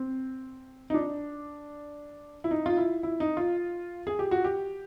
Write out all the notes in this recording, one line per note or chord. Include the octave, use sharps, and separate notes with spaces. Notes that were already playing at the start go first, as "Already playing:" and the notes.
Already playing: C4
D#4
D4
E4
D#4
F4
E4
E4
D#4
F4
G#4
G4
F#4
G4